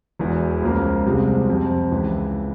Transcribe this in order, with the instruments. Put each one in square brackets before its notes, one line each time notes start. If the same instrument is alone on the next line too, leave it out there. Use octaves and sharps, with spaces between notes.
[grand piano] E1 E2 E3
C#2 C#3 F3 A#3
C2 C3 F3 G#3 C4
F2 C3 F3
C#2 C#3 E3